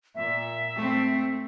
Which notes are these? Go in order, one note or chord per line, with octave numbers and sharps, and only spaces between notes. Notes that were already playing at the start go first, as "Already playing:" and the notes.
A#2 E5
A3 C4